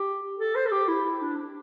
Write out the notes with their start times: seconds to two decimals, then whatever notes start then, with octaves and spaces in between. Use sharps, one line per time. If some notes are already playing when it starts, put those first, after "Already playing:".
Already playing: G4
0.38 A4
0.55 C5
0.67 A4
0.72 G4
0.88 E4
1.05 E4
1.22 D4
1.38 D4